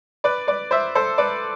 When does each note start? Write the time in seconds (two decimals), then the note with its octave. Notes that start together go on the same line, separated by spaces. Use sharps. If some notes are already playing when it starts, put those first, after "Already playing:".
0.24 B4 D5
0.47 B4 D5
0.71 C5 E5
0.95 A4 C5
1.18 B4 D5